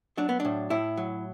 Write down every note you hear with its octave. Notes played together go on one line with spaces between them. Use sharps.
F#3 D4
B3
A2 D4
A2 E4
F#3